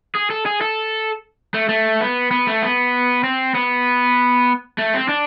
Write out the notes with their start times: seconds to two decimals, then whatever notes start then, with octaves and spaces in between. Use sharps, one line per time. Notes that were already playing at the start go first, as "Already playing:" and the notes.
0.15 G#4
0.30 A4
0.46 G#4
0.61 A4
1.54 A3
1.69 A3
2.01 B3
2.31 B3
2.47 A3
2.63 B3
3.24 C4
3.54 B3
4.78 A3
4.94 C4
5.08 D4